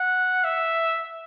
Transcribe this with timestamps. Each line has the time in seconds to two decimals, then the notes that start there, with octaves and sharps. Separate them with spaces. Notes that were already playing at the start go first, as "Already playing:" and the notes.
Already playing: F#5
0.44 E5